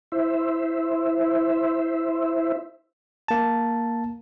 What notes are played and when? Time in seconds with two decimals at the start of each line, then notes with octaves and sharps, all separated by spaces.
0.12 E4 C5 E5
3.28 A#3 A5